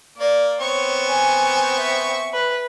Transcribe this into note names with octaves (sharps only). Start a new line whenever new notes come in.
A#3 D5
B3 C4 C#5 C#6
G#5
E5
B4